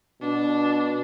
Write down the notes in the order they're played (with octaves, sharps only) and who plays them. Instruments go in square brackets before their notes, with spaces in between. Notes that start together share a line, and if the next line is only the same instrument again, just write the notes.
[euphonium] B2 [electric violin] D4